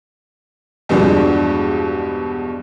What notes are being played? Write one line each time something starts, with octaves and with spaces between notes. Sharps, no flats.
E2 G2 B2 F3 G#3 D4